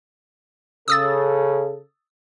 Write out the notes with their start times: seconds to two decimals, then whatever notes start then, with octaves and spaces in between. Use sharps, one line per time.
0.88 C#3 A4 D#6 E6 A6